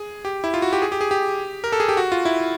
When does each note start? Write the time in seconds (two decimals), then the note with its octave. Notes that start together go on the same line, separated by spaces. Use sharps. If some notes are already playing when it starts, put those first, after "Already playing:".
Already playing: G#4
0.25 G4
0.44 E4
0.54 F4
0.62 F#4
0.73 G4
0.82 G#4
0.92 G4
1.01 G#4
1.11 G4
1.64 A#4
1.72 A4
1.80 G#4
1.89 G4
1.97 F#4
2.12 F4
2.25 E4